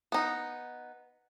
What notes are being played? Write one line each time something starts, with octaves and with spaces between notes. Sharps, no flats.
B3 D#4